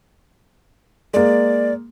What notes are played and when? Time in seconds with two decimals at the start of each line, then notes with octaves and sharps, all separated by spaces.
1.14 G#3 A#3 D5